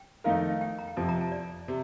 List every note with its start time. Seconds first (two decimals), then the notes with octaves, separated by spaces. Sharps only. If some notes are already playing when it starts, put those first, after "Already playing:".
Already playing: G5
0.24 F2 D#3 A3 D#4 A#4 F5
0.61 G5
0.78 A#5
0.88 G5
0.97 F2 C3 F3 A5
1.09 A#5
1.21 A5
1.32 D5
1.68 C3